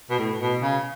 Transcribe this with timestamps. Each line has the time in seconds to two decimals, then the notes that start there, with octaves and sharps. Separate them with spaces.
0.10 B2
0.18 A2
0.40 B2
0.62 C#3